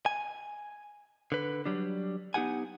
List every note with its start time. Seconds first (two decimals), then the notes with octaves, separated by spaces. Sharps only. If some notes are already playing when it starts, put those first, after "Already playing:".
0.06 G#5
1.32 D3 B4
1.65 F#3 G3 D4
2.34 B3 D#4 G4 F#5 G#5